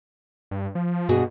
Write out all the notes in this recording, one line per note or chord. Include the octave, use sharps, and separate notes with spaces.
G2
F3
G2 B2 F#4 G#4